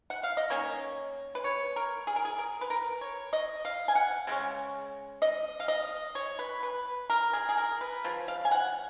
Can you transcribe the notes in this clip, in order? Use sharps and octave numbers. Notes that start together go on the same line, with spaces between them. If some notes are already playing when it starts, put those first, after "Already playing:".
F#5
F5
D#5
D#3 A#3 C#4 C#5
B4
C#5
A#4
G#4
A#4
G#4
A#4
B4
A#4
C#5
D#5
F5
G#5
F#5
C#3 G#3 C#4
D#5
F5
D#5
C#5
B4
B4
A#4
G#4
G#4
A#4
B4
C#3 F3
F5
G#5
F#5